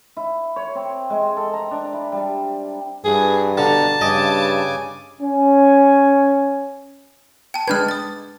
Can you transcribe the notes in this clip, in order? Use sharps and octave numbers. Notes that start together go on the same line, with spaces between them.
E4
C#5
C4
G#3
C4
A4
A#5
D4
E4
G3
G2 E3 G#4
B2 D3 D4 A5 A#5
G2 C#3 D#5 G#5 D6
C#4 G#5
G5 A5
G#3 D4 B4 F6 G6 G#6
D#6 A6